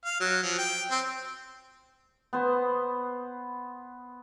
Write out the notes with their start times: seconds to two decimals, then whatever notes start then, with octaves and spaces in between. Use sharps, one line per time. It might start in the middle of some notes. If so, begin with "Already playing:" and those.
0.05 F5
0.20 F#3
0.43 F3
0.58 G5
0.91 C4
2.33 B3 C5